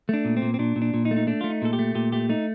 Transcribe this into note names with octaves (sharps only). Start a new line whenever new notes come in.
A3 D4
A#2
C4
A#2
C4
A#2 D4
A#2
D4
A#2
D#4
A3
D#4
A3 D4
A3 F4
D#4
A#2 A4
G4
A3
A#2 G4
A3 G4
A3 D#4